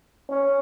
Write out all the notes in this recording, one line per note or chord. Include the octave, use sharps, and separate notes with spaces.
C#4